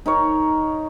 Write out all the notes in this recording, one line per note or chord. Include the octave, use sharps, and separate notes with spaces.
D#4 A#4 C#5